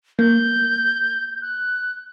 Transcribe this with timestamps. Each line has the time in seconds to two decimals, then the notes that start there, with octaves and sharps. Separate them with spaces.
0.19 A#3 G6
1.42 F#6